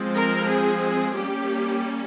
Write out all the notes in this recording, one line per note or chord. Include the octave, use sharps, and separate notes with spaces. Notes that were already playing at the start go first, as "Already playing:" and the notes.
Already playing: F3 G#3 C4
A#4
G#4
G#4
G3 A#3 C#4 G4